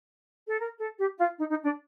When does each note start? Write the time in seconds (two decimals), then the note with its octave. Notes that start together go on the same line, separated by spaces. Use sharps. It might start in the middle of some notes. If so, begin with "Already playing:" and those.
0.48 A4
0.60 A#4
0.79 A4
0.98 G4
1.18 F4
1.38 D#4
1.50 D#4
1.64 D4